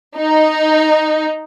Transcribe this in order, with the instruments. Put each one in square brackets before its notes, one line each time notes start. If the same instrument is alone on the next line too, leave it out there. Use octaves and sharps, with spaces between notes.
[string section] D#4